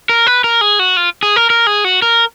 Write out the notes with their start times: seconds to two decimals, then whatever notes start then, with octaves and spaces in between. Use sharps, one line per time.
0.09 A#4
0.27 B4
0.44 A#4
0.61 G#4
0.79 F#4
0.97 F4
1.23 G#4
1.36 A#4
1.50 A#4
1.67 G#4
1.84 F#4
2.02 A#4